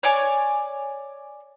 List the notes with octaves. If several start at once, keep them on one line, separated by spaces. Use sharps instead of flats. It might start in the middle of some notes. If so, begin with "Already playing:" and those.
C#5 D5 G#5 D6